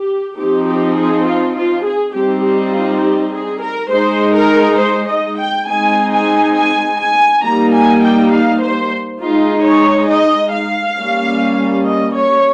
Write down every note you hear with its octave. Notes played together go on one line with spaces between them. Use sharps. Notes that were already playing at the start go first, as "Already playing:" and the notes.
Already playing: G4
F3 C4 D#4 G4
G4
G#4
F4
F4
G#4
G3 C4 D#4 G4
G4
F4
G4
G#4
A#4
G#3 D#4 C5
A#4
C5
D#5
G5
G#3 C4 D#4 G#5
G#5
G#5
G#5
G3 A#3 D#4 A#5
G#5
G5
F5
C5
G#3 D#4 F4
C#5
D#5
F5
G3 A#3 C#4
D#5
C#5